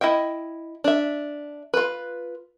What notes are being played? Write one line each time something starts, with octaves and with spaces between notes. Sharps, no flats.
E4 D#5 E5 G5
D4 E5
F4 B4